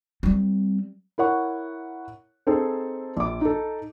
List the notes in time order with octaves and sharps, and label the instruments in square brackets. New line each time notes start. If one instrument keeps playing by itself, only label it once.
[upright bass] G3 C4
[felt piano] E4 A#4 C#5 F#5 C#6
C4 D#4 G#4 A4 C5
A#1 D6
D#4 A4